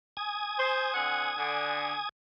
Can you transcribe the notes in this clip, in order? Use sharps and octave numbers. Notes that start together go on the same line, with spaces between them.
G#5 D#6
C5
D3 C4 F#5
D3